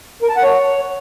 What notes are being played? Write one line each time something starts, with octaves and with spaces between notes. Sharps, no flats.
A#4
A5
F#5
C#5